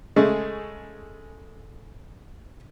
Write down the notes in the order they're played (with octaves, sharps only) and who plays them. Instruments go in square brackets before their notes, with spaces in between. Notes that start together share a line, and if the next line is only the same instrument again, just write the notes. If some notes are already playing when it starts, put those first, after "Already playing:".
[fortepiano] C#3 G#3 A3